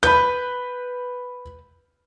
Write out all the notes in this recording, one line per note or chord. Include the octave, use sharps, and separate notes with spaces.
B4 B5 G6